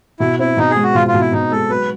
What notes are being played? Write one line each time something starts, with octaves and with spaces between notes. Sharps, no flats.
B2 E4
C4 E4
B2 D#4
G#4
G#3
F#4
B2 F4
F4
B2
E4
B2 D#4
G#3 A4
F#3 B4